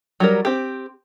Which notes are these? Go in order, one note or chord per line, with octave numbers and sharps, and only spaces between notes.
F#3 G3 A#4
C4 G4